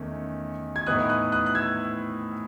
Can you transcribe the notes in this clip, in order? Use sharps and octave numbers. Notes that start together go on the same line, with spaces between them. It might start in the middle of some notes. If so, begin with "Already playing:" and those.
Already playing: E2 D#3 A3 C#4
G#6
A2 E3 B3 D#4 D#6 F#6
D#6 F#6
D#6 F#6
F#6
E6 G#6